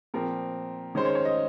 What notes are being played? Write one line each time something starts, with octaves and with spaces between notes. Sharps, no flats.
A#2 F3 C4 A#4
D#3 G#3 C#4 C5
C#5
C#5
D#5